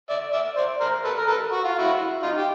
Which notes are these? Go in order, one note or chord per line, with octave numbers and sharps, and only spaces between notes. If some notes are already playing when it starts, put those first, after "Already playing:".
D5 E5
D5 E5
C5 D5
A#4 C5
A4 B4
A#4
A4 B4
F#4
F4
E4 F#4
D#4 F4
G4